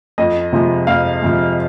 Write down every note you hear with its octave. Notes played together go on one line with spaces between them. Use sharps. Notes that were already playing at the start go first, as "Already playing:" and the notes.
F2 D#5
C3 F3 G#3
F2 F5
C3 F3 G#3